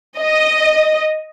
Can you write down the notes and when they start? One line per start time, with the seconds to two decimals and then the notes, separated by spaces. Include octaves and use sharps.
0.19 D#5